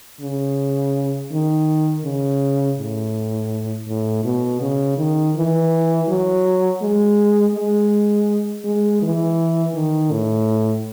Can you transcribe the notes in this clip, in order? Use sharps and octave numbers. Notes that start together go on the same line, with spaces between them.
C#3
D#3
C#3
A2
A2
B2
C#3
D#3
E3
F#3
G#3
G#3
G#3
E3
D#3
A2